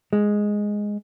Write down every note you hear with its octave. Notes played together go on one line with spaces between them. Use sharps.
G#3